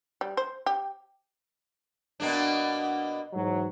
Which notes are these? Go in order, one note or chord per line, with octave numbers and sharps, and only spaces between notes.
G3
C5
G4
B2 A#3 D4
G#2 E3 F#3